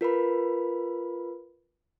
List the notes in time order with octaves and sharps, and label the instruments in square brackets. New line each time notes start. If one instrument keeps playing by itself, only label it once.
[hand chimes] F4 A#4 B4 B5